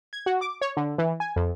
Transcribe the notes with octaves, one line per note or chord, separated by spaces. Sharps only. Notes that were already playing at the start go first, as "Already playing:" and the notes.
G#6
F#4
D6
C#5
D3
E3
G#5
F2